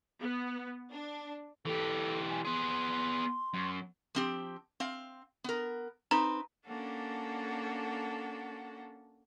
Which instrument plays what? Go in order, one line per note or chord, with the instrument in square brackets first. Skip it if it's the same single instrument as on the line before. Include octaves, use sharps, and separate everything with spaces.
[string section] B3
D4
[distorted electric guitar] E3 G4 [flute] A4
[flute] G#5
[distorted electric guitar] B3 G#4 [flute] C6
[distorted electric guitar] F#2
[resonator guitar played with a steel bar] F3 C4 G4
C4 F5
B3 A#4
[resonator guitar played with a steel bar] C4 D#4 B4 [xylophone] A#5
[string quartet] A#3 C#4 D4 F#4 A4